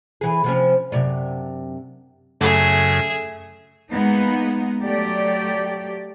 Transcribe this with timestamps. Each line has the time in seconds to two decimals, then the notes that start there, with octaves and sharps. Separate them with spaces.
0.21 E3 G#4
0.44 C3 F3 C#4
0.92 F#2 C3 D4
2.41 F#2 C#3 A3 G#4 E5
3.90 G#3 A#3 B3 D#4
4.82 F#3 A3 G4 D5